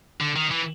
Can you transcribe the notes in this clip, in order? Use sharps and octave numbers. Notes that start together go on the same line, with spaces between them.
D3
D#3
E3